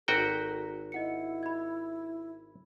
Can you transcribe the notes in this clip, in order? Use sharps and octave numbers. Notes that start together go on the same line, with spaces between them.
G#1 F#4 A4 G5 A#5 A#6 B6
E4 D#5 F#5 C#7
B5 G#6